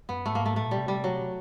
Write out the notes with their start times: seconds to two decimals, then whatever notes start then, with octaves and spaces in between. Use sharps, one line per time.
0.09 F#2 B3
0.25 G#2 A3
0.35 A#3
0.46 A3
0.56 A2 A3
0.67 A#2 G3
0.77 C3
0.88 G3
1.04 F#3